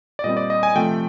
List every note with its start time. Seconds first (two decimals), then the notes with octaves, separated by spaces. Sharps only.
0.19 D5
0.24 A#2 G3 C4 D#5
0.37 D5
0.50 D#5
0.63 G#5
0.76 C3 F3 A3 G5